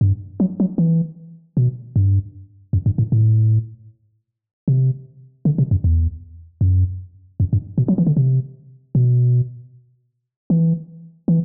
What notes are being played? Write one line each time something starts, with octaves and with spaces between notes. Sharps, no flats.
G2
F#3
F#3
E3
B2
G2
F#2
G2
A2
A2
C3
D3
C3
F#2
E2
F#2
F#2
G2
B2
F#3
E3
D3
C3
B2
E3
E3